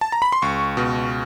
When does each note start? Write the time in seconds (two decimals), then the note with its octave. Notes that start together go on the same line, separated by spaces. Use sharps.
0.01 A5
0.12 A#5
0.22 B5
0.32 C6
0.42 C#2 C#6
0.77 B2